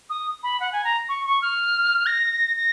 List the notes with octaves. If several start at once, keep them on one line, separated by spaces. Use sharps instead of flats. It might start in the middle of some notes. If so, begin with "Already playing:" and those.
D#6
B5
F#5
G#5
A#5
C#6
C#6
F6
A#6
A#6